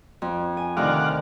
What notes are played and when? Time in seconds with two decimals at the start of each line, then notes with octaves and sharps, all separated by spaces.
0.22 F2
0.57 G#5
0.77 D2 C3 D#3 D5 F5 F#5